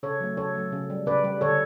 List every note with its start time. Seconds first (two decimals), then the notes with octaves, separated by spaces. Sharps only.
0.03 C#3 A4 C#5
0.20 F#3 A3
0.37 C#3 A4 C#5
0.55 F#3 A3
0.72 C#3
0.90 G3
1.06 C#3 B4 D5
1.24 G3
1.41 D3 A4 C#5